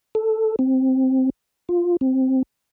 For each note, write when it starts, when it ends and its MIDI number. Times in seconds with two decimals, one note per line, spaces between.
0.15 0.56 69
0.59 1.30 60
1.69 1.96 65
2.01 2.43 60